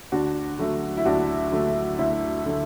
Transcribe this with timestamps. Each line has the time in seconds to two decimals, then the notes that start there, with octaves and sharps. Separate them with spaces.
0.12 D2 D4 F#4
0.59 D3 F#3 A3
0.97 E4
1.05 D2 D4 F#4
1.52 D3 F#3 A3
1.99 D2 E4
2.45 D3 F#3 A3